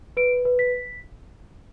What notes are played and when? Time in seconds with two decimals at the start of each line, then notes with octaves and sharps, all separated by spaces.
0.17 B4 D7
0.45 B4
0.59 B6